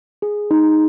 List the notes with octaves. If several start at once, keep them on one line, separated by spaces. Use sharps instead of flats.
G#4
D#4